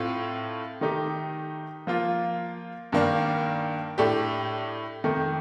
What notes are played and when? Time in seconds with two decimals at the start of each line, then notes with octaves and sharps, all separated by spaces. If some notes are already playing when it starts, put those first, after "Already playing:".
Already playing: A2 A3 C4 F4
0.81 D#3 A3 D#4 G4
1.87 F3 A#3 F4
2.92 G2 D#3 A#3 D4
3.98 A2 A3 D4 G4
5.04 F2 D#3 A3